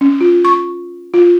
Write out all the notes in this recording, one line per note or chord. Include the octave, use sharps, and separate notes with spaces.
C#4
F4
C#6
F4